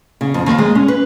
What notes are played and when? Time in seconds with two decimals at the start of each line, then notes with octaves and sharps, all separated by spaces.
0.21 C#3
0.34 F2
0.46 D#2
0.58 G#3
0.75 C#4
0.88 B4